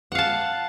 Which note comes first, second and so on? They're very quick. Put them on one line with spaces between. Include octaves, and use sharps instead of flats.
F#5 F5 A5